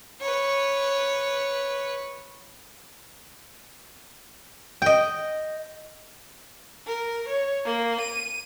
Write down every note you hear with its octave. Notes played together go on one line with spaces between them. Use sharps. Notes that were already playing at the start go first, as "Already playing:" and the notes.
B4 C#5
D#5 G5
A#4
C#5
A#3
D#7